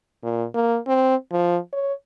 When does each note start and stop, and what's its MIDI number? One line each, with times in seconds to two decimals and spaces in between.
0.23 0.45 46
0.55 0.78 58
0.87 1.15 60
1.32 1.58 53
1.73 1.93 73